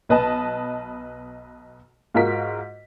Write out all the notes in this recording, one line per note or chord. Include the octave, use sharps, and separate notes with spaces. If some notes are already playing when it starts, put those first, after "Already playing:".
B1 B4 D#5 A5
G#2 F4 F#4 A#4 B6